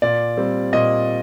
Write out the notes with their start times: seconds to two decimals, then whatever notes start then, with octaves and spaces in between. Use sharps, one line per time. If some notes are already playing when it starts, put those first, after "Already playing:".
0.02 A#2 D5
0.37 G3 C4
0.73 A#2 D#5